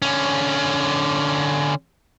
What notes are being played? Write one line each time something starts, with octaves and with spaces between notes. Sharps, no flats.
D3 C#4